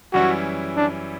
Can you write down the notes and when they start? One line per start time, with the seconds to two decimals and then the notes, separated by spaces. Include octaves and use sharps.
0.13 F#2 E3 G3 C#4 E4 F#4
0.77 D4